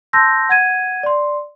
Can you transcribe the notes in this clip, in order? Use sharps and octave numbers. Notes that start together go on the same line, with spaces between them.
A5 C6 E6 G6 A#6
F#5 G#6 D#7
D5 C6